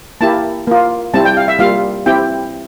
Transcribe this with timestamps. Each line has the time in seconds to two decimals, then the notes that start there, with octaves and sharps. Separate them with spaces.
0.21 A#3 E4 G4 A5
0.68 A#3 F4
1.14 G3 C4 E4 A5
1.25 G5
1.37 F5
1.48 E5
1.59 G3 A#3 F4 F5
2.06 C4 E4 G4 G5